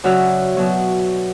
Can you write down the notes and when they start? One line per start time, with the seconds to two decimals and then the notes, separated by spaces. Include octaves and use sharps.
0.04 C#3 F#3 F#4 D5 E5 F6
0.57 B2 F#3